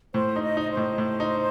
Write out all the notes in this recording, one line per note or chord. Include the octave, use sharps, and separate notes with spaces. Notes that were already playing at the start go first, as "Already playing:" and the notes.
A2 C5
D#4
D#5
D#4 D#5
C5
A2
A2
D#4